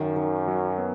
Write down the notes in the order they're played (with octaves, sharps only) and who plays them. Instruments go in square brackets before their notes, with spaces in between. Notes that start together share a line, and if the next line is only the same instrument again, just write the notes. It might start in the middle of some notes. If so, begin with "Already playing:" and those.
Already playing: [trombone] F#2 [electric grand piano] D#3
[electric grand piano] D#3
F#3
B3